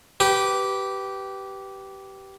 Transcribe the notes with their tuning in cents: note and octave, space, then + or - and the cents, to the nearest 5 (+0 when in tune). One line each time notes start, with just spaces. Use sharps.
G4 -15 B4 +0